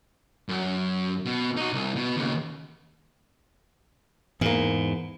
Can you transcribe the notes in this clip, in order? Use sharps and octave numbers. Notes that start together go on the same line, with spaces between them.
F#2
B2
D#4 F#4
C2
B2
D#2 C#3
E2 G#2 A#3